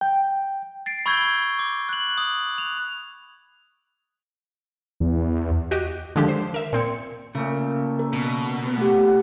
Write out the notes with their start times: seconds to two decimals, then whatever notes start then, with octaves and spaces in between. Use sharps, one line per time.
0.01 G5
0.86 A6 C7 D7
1.06 B5 C#6 E6 G6 G#6 G7
1.59 D6
1.89 F#6 F#7
2.18 D#6
2.58 F#6 F7
5.00 E2
5.71 F#4 G4 D#5
6.16 D3 D#3 F3 G#3 D4 G4
6.28 C5
6.54 A#4 E5
6.73 A#2 C4 G#6 C#7
7.35 A#2 C#3 A3
7.99 A#4
8.13 B2
8.78 A3 G4 F#5
9.07 F#5